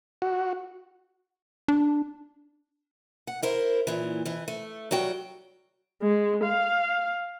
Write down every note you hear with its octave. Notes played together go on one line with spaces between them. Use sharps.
F#4
D4
F#5
E4 A#4 C5
F#2 A#2 E3
F2 E3
A3
F#3 G3 F#4 G5
G#3
F5